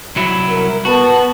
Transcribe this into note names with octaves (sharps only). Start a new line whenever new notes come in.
C2 F#3 E4
A#4
B3 F#4 A5